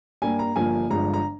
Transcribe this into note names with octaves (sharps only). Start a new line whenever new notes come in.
G2 G3 A#3 G#5
A#5
G1 G2 F3 A#3 G#5
G1 G2 F3 G#3 A#5
A#5